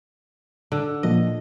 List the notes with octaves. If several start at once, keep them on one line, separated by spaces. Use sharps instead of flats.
D3
A#2 F3 A#3 D#5